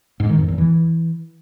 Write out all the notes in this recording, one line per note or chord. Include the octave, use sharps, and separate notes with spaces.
G#2
D#3
F2
E2
E3